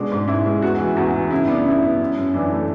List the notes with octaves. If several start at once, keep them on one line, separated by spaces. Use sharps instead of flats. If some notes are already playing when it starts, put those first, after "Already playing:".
Already playing: B2 G#3 D4
G#2
G#2 E4
G#3
E2 F#4
E3
E2 F#4
E3
C#3 E4
E4
B3 D4
C#3 E4
B3
F#2
F#2
E3 D4
A3